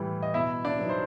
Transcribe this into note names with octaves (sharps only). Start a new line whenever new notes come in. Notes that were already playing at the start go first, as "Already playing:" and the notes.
Already playing: A2 E3 G3
D#5
B2 E4 E5
D4 D5
F#3 B3 D#4
C5